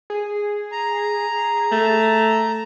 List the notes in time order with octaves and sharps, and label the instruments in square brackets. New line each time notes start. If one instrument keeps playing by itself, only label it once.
[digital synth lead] G#4
[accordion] A#5
[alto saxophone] A3